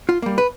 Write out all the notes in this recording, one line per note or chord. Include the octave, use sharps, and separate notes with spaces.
F4
G3 A#3
B4